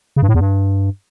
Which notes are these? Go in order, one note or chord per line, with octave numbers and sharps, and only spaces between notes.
C#3
G2
A2
E2
G2